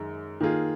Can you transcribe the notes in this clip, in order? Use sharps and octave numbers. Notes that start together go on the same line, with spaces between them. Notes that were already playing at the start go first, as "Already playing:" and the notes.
Already playing: F#2 D#3 G#3
D#3 A#3 F4 G#4